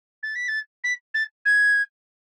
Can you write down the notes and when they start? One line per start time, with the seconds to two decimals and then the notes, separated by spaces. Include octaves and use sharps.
0.23 A6
0.35 B6
0.48 A6
0.84 B6
1.14 A6
1.45 G#6